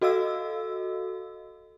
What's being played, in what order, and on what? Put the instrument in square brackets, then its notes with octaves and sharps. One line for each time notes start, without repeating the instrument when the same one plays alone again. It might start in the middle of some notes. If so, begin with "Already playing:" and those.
[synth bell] F#4 A4 D#5 F5 E6